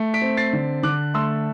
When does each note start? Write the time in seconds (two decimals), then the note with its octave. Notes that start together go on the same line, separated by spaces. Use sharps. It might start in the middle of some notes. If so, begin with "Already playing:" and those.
Already playing: A3
0.14 B6 D7
0.21 C4
0.37 A6 C7
0.53 D3
0.83 D3 D6 F#6
1.14 A3 C6 E6